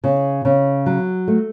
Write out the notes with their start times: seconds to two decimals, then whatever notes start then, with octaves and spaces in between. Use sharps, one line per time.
0.04 C#3
0.45 C#3
0.86 F#3
1.28 A3